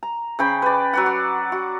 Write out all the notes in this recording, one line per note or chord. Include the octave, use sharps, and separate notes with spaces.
A#5
C#3 C5 G5 B5
B4 D5
F#3 C#5 F#5
D5
F#4